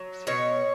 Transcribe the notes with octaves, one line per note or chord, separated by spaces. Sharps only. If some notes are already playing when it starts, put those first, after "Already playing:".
Already playing: F#3
B2 C#5